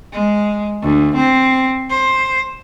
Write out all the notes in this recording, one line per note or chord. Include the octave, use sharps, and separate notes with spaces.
G#3
D2
C4
C5